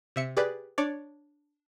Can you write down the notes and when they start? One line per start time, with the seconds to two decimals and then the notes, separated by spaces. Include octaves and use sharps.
0.16 C3 E5 C#7
0.37 G4 G#4 B4 D5
0.78 D4 C#5 D5